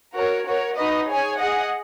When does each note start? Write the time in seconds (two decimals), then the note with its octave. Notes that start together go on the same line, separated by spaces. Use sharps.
0.15 F#4 A#4 C#5
0.46 F#4 A#4 C#5
0.76 D#4 F#4 B4 D#5
1.08 G#4 C#5 G#5
1.38 G#4 D#5 F#5